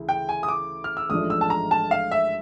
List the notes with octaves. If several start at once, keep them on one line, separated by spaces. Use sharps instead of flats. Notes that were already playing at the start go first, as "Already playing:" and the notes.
Already playing: D2 C#3 E3
G5
G#5
D#6
D6
F6
E6
A1 G#2 F3 A3 D4 D#6
E6
A5
A#5
A5
F5
E5